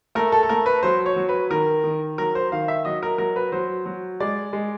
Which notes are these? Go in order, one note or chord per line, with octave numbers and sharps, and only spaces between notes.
A3 A#4
A4
A4
A3 A#4
B4
F#3 C5
C#5
F#3
B4
D#3 A#4
D#3
F#3 A#4
C5
D#3 F5
E5
F#3 D#5
A#4
F#3 A#4
B4
F#3 C5
F#3
G#3 D5
G#3